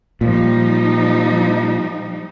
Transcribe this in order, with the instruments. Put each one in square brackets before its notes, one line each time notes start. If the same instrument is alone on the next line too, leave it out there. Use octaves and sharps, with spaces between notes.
[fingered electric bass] A#2 [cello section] F3 G3 D#4